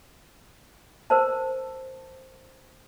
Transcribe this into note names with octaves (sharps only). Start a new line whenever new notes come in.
A#4 C5 A5